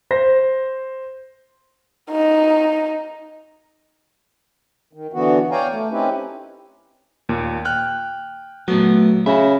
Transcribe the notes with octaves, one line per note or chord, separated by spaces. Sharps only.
C5 A#6
D#4
D#3
D3 E3 B3 F#4
C#5 D5 F5 G5 G#5 A#5
A3
C4 C#4 D#4 E4 G4 B4
D#2 A#2
G5 F6 F#6
A#2 F#3 A3 B3
C#3 F#4 E5 B5